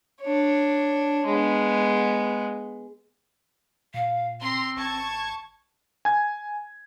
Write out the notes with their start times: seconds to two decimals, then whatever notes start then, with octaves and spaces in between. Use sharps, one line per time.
0.21 D4 C#5
1.25 G#3 B3
3.94 A#2 F5
4.41 C4 A#5 C6
4.77 G#1 A5 C#6 G#6
6.05 G#5 G#6